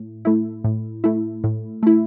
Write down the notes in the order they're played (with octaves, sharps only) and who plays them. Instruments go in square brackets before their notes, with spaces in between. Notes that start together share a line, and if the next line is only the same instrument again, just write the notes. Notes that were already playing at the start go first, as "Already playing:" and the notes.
Already playing: [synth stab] A2
A3 E4
A2
A3 E4
A2
A3 E4